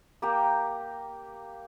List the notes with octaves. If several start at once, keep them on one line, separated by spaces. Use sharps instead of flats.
A#3 G4 G5 A#5